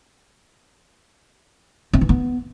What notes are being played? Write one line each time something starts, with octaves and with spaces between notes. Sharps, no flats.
C4
E3
B3